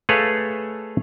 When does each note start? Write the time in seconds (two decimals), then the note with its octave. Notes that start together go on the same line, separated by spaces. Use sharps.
0.09 A3 G#4 A4 B4 C#5 F5